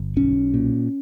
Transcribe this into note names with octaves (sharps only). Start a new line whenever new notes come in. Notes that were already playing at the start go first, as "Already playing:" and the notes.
Already playing: G1
B1 C#4
A#2